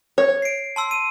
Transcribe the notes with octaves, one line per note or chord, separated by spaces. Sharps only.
C#5
C7 D7
A5 C6 E6
D#7